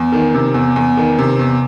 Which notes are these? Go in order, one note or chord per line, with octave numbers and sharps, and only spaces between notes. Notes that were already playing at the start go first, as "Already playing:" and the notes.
Already playing: E2
D#3
C3
E2
E2
D#3
C3
E2